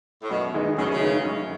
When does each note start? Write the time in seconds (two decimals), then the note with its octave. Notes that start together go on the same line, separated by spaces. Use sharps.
0.23 A2
0.30 F#2 B2
0.54 E3 G#3 D#4
0.78 F#2 C#3
0.85 B2
0.92 C#3
1.01 E3 G#3 D#4
1.25 F#2